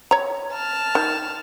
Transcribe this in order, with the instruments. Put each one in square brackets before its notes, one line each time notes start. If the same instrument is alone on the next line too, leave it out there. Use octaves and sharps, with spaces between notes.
[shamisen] C#5 A#5
[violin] A5 F6
[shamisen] D#3